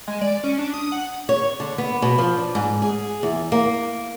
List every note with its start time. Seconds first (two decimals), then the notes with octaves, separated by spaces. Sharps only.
0.08 G#3
0.21 D5
0.44 C#4
0.59 D4
0.74 D#6
0.92 F#5
1.29 C#5
1.60 D3
1.78 B3
2.02 B2
2.18 F3
2.38 D4
2.55 G#2
2.82 G#4
3.23 E2
3.52 A#3